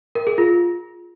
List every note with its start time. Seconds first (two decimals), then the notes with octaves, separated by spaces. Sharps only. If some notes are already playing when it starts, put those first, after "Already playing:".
0.15 A#4
0.27 G#4
0.38 F4